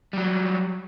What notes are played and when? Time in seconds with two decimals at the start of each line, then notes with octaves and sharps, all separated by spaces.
0.13 F#3 G3